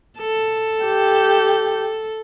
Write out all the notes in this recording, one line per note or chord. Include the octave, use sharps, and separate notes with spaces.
A4
G4